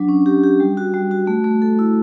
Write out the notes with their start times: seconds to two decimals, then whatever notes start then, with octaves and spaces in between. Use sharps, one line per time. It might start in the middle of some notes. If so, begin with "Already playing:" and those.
Already playing: F#3 D4
0.09 C#4
0.26 G4
0.44 G4
0.60 G3
0.77 F#4
0.94 G3
1.11 F#4
1.27 A3
1.44 A3
1.62 A4
1.79 E4